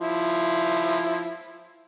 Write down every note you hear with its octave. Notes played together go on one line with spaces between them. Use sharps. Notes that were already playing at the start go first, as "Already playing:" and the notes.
F3 E4